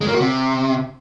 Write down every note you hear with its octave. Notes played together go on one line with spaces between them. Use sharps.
G#3
A#3
F#4
C3